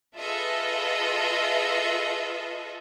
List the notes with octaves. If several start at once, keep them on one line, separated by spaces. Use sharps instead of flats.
F4 G#4 A4 B4 D#5 E5